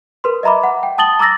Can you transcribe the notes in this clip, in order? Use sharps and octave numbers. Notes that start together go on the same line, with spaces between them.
A#4 B4 C6
D#5 E5 A#5 B5 D6
F#5
G5
A5 D#6 A6 F#7 G7
A#5 D6 E6 A6 A#6